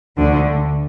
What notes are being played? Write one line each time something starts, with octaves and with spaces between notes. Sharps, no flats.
D2 D3